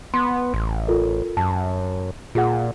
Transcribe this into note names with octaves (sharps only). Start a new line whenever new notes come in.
B3 C6
A1
F4 A4 A#4
F#2 A5
A#2 F4 G#4 F#5